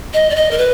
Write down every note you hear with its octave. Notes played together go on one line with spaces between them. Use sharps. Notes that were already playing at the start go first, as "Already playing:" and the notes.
D#5
D5
D#5
A#4
B4